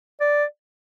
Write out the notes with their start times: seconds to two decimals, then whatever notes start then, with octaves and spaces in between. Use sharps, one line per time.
0.20 D5